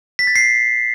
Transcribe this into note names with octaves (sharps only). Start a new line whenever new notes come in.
B6
A6
C7